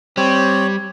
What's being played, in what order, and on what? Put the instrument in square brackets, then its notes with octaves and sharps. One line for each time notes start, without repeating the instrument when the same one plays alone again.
[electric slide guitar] G3 [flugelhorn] C4 [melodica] C#5